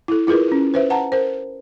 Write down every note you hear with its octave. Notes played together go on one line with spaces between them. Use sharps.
E4 A4
E4 F4 G#4 A#4 B4
C#4 E4
B4 C5 E5
F#5 A5 A#5
A#4 C5